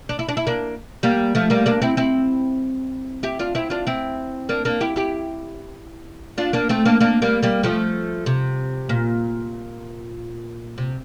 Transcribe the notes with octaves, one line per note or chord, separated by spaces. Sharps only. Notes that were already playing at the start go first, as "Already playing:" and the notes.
D4
E4
D4
E4
A#3 D4
G3 A#3
F3 A3
G3 A#3
A#3 D4
C4 E4
C4 E4
E4 G4
D4 F4
C4 E4
D4 F4
C4 E4
A#3 D4
A#3 D4
E4 G4
E4 G4
D4 F4
A#3 D4
A3 C4
A#3 D4
A#3 D4
G3 A#3
G3 A#3
F3 A3
C3
A#2
C3